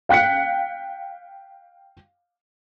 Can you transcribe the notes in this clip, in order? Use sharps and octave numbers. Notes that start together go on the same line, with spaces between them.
F5 G5 F#6 B6 C#7